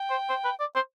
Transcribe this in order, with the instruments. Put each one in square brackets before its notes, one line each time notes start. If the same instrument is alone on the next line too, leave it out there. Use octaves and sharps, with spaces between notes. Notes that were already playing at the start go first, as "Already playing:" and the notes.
Already playing: [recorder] G5
[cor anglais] C5
C5
B4
D5
C5